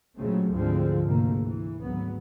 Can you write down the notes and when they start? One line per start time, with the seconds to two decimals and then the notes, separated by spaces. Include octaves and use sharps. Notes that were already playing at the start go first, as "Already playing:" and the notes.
0.16 A#2 C#3 F#3 G#3 A3 C4
0.52 D2 G#2 D3 F3 G#3 C4
1.04 G#1 D2 C3 A3 A#3
1.40 E3
1.82 G#1 D2 F#3 B3